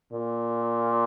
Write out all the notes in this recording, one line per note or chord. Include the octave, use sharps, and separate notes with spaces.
A#2